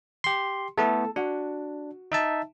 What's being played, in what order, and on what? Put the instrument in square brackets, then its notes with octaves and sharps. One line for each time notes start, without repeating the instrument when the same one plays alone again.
[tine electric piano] G4 C6
[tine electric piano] A3 B3 E4 [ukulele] A4
[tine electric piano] D4 [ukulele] F#4
[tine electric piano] D#4 E5 A5